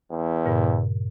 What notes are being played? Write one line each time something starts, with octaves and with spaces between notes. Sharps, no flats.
E2
G2 A#2 C#3